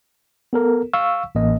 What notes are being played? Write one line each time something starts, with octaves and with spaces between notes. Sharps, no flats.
B3 A4 A#4
F5 C#6 E6
A1 A#3 D#5